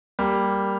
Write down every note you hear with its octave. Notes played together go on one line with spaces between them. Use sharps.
G3 A#3